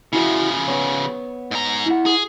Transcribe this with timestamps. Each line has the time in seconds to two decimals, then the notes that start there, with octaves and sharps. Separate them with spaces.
0.13 C#3 F3 E4 F#4 E5
0.68 B3 C#5
1.51 G#2 A#5
1.86 E4 F#5
2.06 G#4